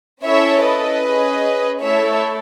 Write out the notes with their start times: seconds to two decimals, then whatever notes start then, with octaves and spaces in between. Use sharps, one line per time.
0.24 C#4 E4 A4 C#5 E5
0.64 B4 D#5
1.04 C#4 G#4
1.82 A3 E4 A4 C#5 E5